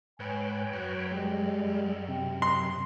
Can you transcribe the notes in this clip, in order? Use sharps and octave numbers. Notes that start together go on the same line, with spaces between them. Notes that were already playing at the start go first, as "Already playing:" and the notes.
G#2 B4 C#5 G5 G#5
F#2 F#3
G3 G#3 G5
C3
C6